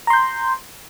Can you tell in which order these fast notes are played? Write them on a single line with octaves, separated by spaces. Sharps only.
A#5 C6 G6